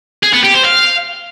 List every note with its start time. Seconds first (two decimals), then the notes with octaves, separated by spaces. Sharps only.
0.23 G#4
0.33 B3
0.44 G4
0.54 C5
0.64 F5